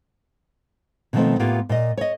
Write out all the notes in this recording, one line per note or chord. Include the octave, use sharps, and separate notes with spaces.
B2 D3 D#3 F3 A3 C4
A2 A#3 B3 F4 G4
A#2 D#5
C#5 D#5